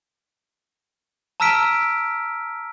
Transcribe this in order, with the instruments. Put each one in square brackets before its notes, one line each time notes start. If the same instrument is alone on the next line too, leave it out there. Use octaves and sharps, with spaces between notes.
[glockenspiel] A5 A#5 E6 F6 B6 D7